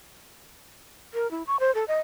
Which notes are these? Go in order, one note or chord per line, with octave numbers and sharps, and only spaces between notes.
A#4
E4
C#6
C5
A4
D#5